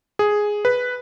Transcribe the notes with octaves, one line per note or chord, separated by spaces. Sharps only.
G#4
B4